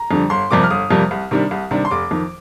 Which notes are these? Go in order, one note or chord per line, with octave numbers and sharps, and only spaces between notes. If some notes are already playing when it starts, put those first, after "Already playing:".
Already playing: A#5
F2 D3 G3
G1 C6
F2 C3 G3 A#3 D6
F6
G1 D#6
F2 C3 G3 A#3
C2
C3 D#3 G3 D4
C2
C3 D#3 G3 D4
C6
F1 D6
F2 D#3